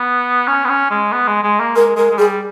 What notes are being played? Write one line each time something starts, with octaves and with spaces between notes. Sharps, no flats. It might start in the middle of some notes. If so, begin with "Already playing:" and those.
Already playing: B3
C#4
B3
C#4
G#3
B3
G#3
G#3
A#3
G#3 A#4
G#3 A#4
G#3
G3 G#4